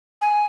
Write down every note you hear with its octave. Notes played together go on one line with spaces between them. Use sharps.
G#5